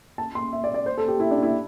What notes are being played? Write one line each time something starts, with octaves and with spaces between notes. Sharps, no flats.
A5
C6
E5
D5
D5
C5
A4
G4
E4
D4
E4